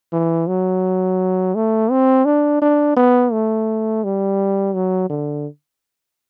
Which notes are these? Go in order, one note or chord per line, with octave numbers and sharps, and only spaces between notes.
E3
F#3
A3
C4
D4
D4
B3
A3
G3
F#3
D3